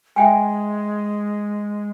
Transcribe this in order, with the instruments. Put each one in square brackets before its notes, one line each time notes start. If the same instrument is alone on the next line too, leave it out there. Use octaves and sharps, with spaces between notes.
[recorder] G#3 [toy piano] E5 G5 G#5